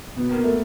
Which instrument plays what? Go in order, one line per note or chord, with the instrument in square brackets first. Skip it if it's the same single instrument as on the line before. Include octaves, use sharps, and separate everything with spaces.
[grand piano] B2 [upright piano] B3
[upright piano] A#3
[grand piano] B3
[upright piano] A3